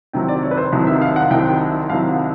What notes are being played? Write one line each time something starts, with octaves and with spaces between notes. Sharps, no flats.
C2 C3 D#3 F#3 G5
D5
C#5
B4
C5
C2 C3 D#3 F#3
E5
F5
F#5
C2 C3 D#3 F#3 G5
C2 C3 D#3 F#3 F5
F#5